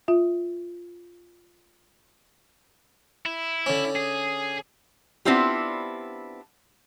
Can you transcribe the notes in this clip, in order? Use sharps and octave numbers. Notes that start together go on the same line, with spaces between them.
F4 E5
E4
D3 C#4
G#4
B3 C4 D4 E4 F4 G4